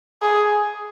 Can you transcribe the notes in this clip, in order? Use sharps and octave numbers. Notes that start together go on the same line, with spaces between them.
G#4